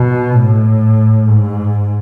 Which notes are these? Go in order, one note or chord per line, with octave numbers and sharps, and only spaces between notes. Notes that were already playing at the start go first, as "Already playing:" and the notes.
Already playing: B2
A2
G#2